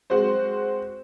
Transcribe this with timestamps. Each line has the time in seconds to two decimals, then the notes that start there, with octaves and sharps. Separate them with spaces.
0.10 G#3 C4 F#4 C5